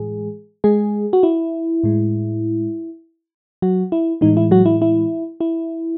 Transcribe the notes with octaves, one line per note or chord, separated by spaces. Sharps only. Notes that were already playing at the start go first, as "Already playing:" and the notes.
Already playing: A2 E3 G#3 G#4
G#3 G#4
F#4
E4
A2 G#3
F#3 F#4
E4
A2 E3 G#3 D#4
E4
F#3 F#4
E4
E4
E4